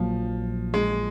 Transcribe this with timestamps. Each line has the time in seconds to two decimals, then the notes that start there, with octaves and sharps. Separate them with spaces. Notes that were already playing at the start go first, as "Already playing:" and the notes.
Already playing: A#1 A#2 F3 F#3
0.74 G#3